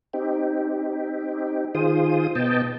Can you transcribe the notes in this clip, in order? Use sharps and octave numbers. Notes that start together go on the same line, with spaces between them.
C4 D#4 G4
D#3 F4 G#4 C5 D#6
B2 B3 D#5 G5 A5